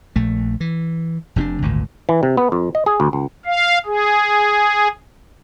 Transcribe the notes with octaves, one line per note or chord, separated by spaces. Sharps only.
A#1 A3
E3
F1 C3 C#4 D4
G#1 D2 A#2
E3
C3
B3
F2
D#5
G#4
D2
C#2
F5
G#4